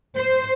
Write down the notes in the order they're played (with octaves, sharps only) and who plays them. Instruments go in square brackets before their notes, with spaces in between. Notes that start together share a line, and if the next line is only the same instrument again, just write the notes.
[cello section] C5